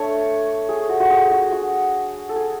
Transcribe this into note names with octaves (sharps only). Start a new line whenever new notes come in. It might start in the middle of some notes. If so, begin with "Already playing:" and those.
Already playing: A3 D4 C#5
G#4
F#4
F#4
G#4
F#4
F#4
A4
G#4